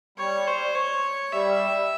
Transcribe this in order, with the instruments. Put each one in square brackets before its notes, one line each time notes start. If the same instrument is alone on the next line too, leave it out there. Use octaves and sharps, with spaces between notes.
[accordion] G3 [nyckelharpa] C#5
[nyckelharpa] C5
C#5
[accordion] G3 [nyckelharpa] E5